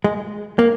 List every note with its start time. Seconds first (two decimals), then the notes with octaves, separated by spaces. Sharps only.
0.04 G#3
0.59 A#3